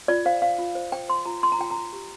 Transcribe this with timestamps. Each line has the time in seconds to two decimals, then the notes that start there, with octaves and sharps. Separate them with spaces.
0.08 F4 D5
0.25 C5 F5
0.42 C5 F5
0.59 F4
0.75 C5
0.92 C5 G5
1.08 C5 C6
1.26 F4 A#5
1.42 F4 C6
1.52 A#5
1.59 F4 G5
1.71 A#5
1.77 F4
1.93 G4